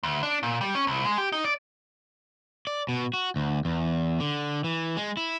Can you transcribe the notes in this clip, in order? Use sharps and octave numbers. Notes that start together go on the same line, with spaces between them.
D2
D4
A#2
G3
C#4
C2
G#3
G4
D#4
D5
D5
B2
F#4
D2
E2
D3
E3
G#3
E4